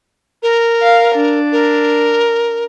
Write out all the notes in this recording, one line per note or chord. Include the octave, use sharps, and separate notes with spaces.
A#4
F5
D4
A#4